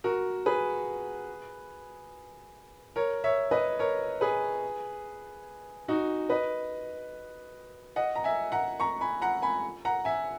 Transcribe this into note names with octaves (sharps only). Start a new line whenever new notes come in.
F#4 A#4
G#4 B4
A#4 C#5
C#5 E5
B4 D#5
A#4 C#5
G#4 B4
D#4 F#4
B4 D#5
D#5 F#5
A#5
E5 G#5
F#5 A#5
A#5 C#6
G#5 B5
F#5 A#5
G#5 B5
F#5 A#5
E5 G#5